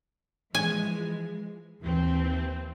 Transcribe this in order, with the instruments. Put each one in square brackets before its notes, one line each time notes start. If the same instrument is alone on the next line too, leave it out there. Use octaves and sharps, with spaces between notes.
[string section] E3 F3 G#3 [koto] G#5
[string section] D#2 E3 C4